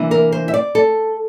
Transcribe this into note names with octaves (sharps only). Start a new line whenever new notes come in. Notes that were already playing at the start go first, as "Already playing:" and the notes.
Already playing: C3 E3 A#3 D4
A#4
C5
E5
D5
A4